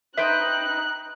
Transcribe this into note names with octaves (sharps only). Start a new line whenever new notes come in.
D#4 B4 C5 E5 G5 F#6